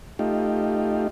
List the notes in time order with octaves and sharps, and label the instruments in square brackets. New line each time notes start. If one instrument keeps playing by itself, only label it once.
[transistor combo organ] A3 D#4 F4 G4